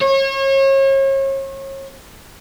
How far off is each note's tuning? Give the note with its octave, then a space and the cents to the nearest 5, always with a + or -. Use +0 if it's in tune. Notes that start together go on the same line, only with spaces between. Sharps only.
C#5 -35